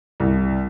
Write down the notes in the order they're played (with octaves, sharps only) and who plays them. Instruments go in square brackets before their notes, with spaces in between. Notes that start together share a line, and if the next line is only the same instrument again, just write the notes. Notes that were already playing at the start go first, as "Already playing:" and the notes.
[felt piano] C2